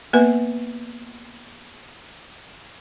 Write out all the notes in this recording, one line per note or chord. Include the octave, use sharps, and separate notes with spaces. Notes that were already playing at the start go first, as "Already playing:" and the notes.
A#3 B3 B4 E5